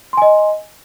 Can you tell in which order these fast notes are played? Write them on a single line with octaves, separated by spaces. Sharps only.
C6 G#5 D#5